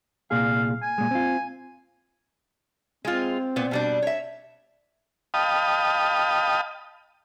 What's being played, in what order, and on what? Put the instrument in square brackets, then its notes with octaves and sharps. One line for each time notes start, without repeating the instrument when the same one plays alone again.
[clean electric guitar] C2 A#2 G#4 [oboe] F5
[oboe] G#5
[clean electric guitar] A#2 G#3
C4 F4
[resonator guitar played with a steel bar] G#3 F4 [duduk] C4
[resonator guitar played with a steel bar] A#2 B3
B2 G3 D4
C#5 E5
[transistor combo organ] D#5 F5 G5 A5 B5 D#6